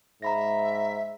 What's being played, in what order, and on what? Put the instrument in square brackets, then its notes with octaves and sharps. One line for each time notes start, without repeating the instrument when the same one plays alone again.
[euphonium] G#2 [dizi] E5 [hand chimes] A#5 B5 A#6